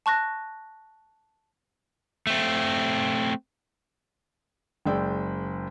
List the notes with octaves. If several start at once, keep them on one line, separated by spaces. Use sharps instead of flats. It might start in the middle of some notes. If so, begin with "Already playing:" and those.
A5 C#6 F#6 A#6
A3 C4
F#1 G#3 D5 G5 E6